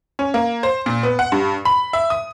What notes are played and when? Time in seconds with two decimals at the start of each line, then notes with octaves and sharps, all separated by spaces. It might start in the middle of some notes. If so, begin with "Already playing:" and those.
0.19 C#4
0.34 A#3
0.63 C5
0.86 A#2
1.03 B3
1.19 F#5
1.32 G2
1.65 B5
1.93 E5
2.10 D#6